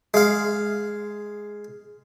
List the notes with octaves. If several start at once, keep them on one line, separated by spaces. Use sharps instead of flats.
G#3 F5